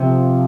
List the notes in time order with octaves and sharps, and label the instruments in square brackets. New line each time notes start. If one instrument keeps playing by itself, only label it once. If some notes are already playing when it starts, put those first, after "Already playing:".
Already playing: [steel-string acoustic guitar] C3 [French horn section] F3